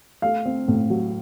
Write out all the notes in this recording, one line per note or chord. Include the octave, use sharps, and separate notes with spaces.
A3 F5
C4
A2
F#3